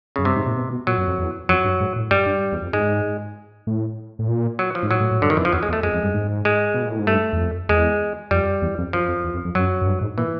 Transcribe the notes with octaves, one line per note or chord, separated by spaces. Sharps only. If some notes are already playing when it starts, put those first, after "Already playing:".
F#2 C#3
G2 C3
G#2
A#2
B2
B2
A#2 F#3
F#2
F2
E2
F2 F#3
G2
G#2
A2
G2 G3
G2
E2
F2
G#2 G#3
A2
A2
A#2
F#3
F3
G#2
A2 F#3
A2
A2
G2 D3
D#3
F2 E3
F3
E2 F#3
G#3
E2
A3
F2 G#3
F2
G2
G#2
G#3
B2
A#2
A2
G#2
G2 A3
E2
F2
E2 G#3
F2 G3
E2
F2
F#2 F3
F2
E2
F2
F2
F#2 F#3
F#2
G2
G#2
A#2 E3